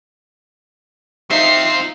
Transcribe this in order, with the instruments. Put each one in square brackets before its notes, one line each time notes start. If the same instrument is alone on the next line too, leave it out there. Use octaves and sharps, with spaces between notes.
[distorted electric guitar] C4 F4 [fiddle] D#4 [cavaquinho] E5 [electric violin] C7